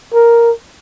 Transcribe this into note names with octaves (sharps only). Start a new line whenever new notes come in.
A#4